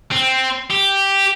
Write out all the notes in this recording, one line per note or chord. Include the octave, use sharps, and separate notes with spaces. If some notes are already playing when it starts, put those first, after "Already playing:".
C4
G4